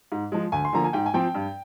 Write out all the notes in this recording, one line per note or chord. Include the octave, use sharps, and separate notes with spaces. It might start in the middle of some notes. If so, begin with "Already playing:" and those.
G#2
F3 G#3
D2 G#5
C6
D3 F3 A#3 A#5
G#5
G#2 G5
G#5
F3 C4 G5
G2